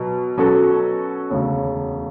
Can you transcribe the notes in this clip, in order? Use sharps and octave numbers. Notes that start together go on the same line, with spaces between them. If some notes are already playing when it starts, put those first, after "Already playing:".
Already playing: B2 F#3
B2 F#3 C#4 F#4 A4
E1 D2 C#3